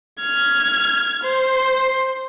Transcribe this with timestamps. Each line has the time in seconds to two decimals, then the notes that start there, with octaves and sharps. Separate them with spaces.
0.20 F6 G#6
1.23 C5